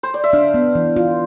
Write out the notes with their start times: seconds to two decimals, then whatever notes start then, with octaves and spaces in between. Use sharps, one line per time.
0.03 C5
0.14 D5
0.24 E5
0.33 D4 F5
0.54 B3
0.75 E3
0.96 F4